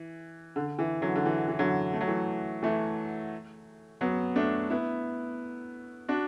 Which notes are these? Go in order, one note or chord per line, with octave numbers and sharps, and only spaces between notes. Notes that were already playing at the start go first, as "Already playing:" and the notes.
Already playing: E3
D3
E3
D3 F#3
D3
E3
E3
D3 F#3
A3
F#3
E3 A3
E3 A3
F#3 B3
A3 D4
B3 E4
D4 F#4